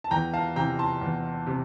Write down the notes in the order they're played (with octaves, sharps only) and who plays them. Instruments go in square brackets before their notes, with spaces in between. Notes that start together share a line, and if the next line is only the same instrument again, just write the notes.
[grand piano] A5
E2 G5 A#5
F5 A5
C3 E3 G5 A#5
A5 C6
E2
C3